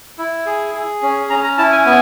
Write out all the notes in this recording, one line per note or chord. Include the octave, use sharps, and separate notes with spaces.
E4
G#4
G#4
C#4
C#4 A#5
A#5
E4 A5
G#5
B3 G#5